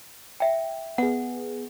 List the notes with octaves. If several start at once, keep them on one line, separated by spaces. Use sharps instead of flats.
E5 G5
B3 G#4 F#5